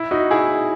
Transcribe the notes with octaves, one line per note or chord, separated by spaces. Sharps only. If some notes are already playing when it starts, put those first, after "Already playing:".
Already playing: E4
D#4 F#4
E4 G#4